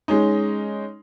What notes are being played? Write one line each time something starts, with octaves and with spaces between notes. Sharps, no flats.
G#3 C#4 D#4